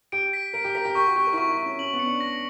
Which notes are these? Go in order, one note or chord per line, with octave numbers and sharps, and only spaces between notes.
G4 D7
B6
A#4 D7
G4
A#4 B6
G4
G4 C#6
F#4
G4 C#6
A#4
E4
F#4 C#6
E4
C#6
C#4
C#4 F#7
B3
C#7
D4
A#6